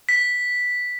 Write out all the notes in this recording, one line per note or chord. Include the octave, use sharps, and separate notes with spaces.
B6